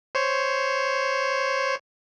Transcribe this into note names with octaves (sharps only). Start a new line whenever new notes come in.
C5 C#5